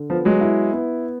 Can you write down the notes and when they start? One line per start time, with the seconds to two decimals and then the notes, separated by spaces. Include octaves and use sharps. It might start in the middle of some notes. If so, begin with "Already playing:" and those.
Already playing: D3
0.10 F3 B3
0.25 F#3 G#3
0.41 E4
0.73 B3